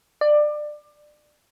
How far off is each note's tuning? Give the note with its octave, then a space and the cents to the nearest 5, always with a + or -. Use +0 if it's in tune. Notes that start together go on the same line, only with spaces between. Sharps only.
D5 +25